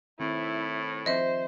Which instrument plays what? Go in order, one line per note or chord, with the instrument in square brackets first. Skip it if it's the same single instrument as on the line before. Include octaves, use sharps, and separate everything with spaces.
[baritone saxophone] A2 [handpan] D#3 C4 [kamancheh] E4
[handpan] F3 C4 [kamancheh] C5 [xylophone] D#5 E5